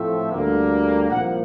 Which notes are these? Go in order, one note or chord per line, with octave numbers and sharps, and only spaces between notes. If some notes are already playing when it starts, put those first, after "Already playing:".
Already playing: A2 F3 A3 C4 E5
D2 D3 G3 A#3
C2 A#2 F3 A#3 F#5